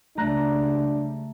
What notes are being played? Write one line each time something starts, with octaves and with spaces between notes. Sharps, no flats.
C#2 C#3 G3 A3 D4 A#5 F#6